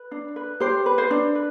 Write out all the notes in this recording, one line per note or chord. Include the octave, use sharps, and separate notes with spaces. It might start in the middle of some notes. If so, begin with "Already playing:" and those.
Already playing: B4
D4
B4
G4 C5
B4
C5
D4
B4